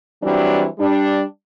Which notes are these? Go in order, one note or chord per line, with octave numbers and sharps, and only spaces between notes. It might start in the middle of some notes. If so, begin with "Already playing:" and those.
E3 F#3 G3 C4 D4
G3 D4